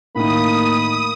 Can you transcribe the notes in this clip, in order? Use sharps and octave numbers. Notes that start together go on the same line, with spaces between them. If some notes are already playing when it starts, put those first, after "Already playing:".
A2 D#3 A#3 B5 D#6